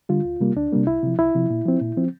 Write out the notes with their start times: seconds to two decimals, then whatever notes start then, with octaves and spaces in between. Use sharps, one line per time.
0.09 D3 G3 F4
0.25 D2
0.40 C3 G3 A#3
0.56 D2 D4
0.72 C3 G3 A#3
0.87 C2 E4
1.03 C3 F3
1.19 C2 E4
1.35 C3 F3
1.50 A#2
1.66 F3 C4
1.81 A#2
1.97 F3 C4